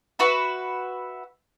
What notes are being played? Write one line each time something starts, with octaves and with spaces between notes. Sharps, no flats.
F#4 B4 E5